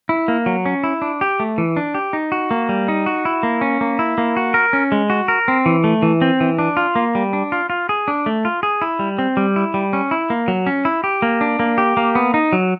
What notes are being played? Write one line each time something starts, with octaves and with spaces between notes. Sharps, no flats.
E4
A#3
F#3
C#4
E4
D4
G4
A3
E3
D4
G4
D#4
F#4
A#3
G3
D#4
F#4
E4
A#3
C#4
A#3
E4
A#3
F#4
A#4
C#4
G#3
F#4
A#4
C4
E3
A3
E3
C4
E3
D4
F4
A#3
G3
D4
F4
F4
G#4
D4
A3
F4
G#4
E4
G3
C4
G3
E4
G3
C#4
E4
A#3
F#3
C#4
E4
G4
A#3
D4
A#3
G4
A#3
B3
D#4
F#3